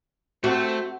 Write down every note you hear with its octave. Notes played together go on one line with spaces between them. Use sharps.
A3 C4 F#4 A4